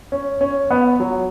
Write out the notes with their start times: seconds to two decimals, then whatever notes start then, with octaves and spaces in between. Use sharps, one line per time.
0.12 C#4
0.41 C#4
0.71 B3
1.00 F#3